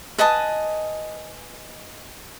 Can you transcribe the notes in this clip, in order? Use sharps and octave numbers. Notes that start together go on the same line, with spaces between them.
B4 D#5 G#5 A5